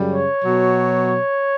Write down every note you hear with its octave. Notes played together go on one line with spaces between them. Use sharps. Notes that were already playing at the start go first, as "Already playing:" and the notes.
Already playing: F#2 C#3 G3
C#5
B2 F#3